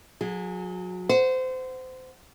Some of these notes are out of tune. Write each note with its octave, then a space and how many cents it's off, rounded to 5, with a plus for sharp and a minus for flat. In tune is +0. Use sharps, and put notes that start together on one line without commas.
F#3 -30 G#4 +0
C5 -25 F#5 +0